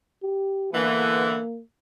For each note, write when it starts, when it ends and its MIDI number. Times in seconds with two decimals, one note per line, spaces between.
0.23 0.73 67
0.74 1.38 50
0.74 1.38 52
0.74 1.61 58
0.74 1.38 59